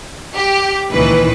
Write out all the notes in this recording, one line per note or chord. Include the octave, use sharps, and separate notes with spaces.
G4
C#2 A#2 D#3 E3 B4